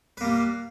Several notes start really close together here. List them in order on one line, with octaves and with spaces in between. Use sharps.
B4 A#3 G3